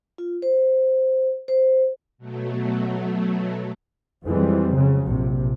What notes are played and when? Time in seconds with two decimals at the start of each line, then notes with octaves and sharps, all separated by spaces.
0.18 F4
0.42 C5
1.48 C5
2.18 B2 F#3 A3
4.27 F2 E3 G3 G#3 C4
4.76 C#3 F#3
5.07 A#1 C3